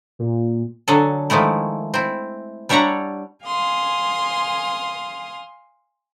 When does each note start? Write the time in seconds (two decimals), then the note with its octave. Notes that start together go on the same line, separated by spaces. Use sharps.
0.19 A#2
0.88 D3 F#3 G#4 A4
1.30 D#3 F3 G#3 A3 E4
1.94 C4 E4
2.69 G3 D4 C#5 E5 F#5 A#5
3.45 F5 G#5 C6 D#6